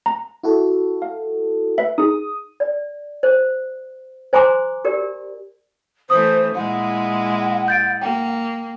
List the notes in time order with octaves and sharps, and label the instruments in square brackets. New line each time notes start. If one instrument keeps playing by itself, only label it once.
[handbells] A#5
[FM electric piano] E4 F#4 A4
[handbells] F5
B4 E5
[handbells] D#4 G#4 [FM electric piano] D#6
[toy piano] D5
C5
C5 G#5 A#5 C6 D6
G4 A#4 D5
[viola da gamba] E3 A3 [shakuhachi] C5 [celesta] D#6
[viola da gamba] A#2 G#3 E4 [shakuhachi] F#5
[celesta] G6 A6 D7
[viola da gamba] A#3 [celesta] G5